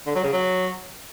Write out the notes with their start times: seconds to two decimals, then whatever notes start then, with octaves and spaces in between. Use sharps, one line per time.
0.07 D3
0.15 F#3
0.24 C#3
0.32 F#3